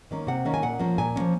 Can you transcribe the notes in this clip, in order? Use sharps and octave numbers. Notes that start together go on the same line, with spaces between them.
D#3 A#3 C#4
C3 F#5
D#3 A#3 C#4
G#5
A#2 F#5
F3 A#3 C#4
A#2 G#5
F3 A#3 C#4